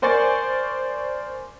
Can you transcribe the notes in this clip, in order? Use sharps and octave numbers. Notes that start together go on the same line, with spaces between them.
A#4 C5 D5 G#5 C#6 A6